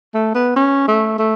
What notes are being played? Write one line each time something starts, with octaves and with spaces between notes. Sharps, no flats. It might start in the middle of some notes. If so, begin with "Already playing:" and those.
A3
B3
C#4
A3
A3